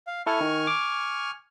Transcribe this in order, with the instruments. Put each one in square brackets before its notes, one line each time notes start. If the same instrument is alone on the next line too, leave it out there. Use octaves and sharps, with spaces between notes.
[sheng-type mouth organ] F5
[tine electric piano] E4 A4 [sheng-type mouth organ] G#5 C#6 F6
[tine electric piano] D#3
D6